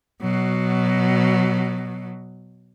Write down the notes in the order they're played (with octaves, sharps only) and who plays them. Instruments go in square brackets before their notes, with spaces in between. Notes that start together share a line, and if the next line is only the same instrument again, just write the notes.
[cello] B2 F#3